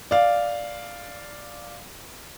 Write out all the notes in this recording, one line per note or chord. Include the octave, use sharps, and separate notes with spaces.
D5 F5